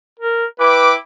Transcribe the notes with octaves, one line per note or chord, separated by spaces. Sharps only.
A#4
E4 B4 G5 D6